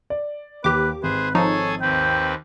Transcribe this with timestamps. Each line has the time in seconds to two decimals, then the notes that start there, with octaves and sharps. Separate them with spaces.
0.10 D5
0.64 D#2 G4 B4 D6
1.03 G#1 G#4 B4 C5
1.35 F3 D#4 G#4 A4 C#5 G#5
1.81 D#2 C4 B4 G5